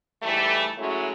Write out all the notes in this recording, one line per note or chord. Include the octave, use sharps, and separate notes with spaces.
G#2 E3 G3 A3
F#3 G#3 A3 C#4 E4 F#4